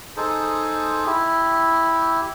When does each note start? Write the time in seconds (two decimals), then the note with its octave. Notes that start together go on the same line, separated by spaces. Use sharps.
0.17 D#4 G#4 A4 C5
1.06 E4 G4